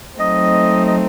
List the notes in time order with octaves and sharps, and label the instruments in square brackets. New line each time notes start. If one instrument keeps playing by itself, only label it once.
[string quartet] F#3 A3 C4 D#4 [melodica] D#5
[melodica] D#5